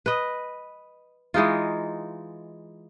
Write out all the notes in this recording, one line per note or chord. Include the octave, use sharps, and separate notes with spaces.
B4 D#5
E3 G#3 D#4 F4